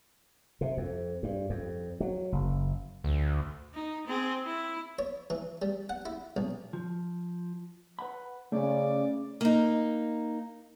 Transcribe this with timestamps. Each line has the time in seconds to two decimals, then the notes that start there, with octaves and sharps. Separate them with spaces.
0.61 C3
0.77 F2
1.23 G2
1.50 F2
2.00 F#3
2.32 F#1
3.04 D2
3.74 D#4
4.07 C4 G#4
4.46 E4
4.99 C#5
5.30 E3
5.62 G3
5.89 F#5
6.06 E4
6.37 B1
6.73 F3
7.99 B4 F#5 B5
8.52 C#3 A3 C#4 A4 D5
9.41 A#3 D#4